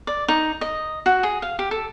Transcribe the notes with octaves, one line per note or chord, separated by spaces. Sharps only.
D5
D#4
D#5
F#4
G#4
F5
G4
A4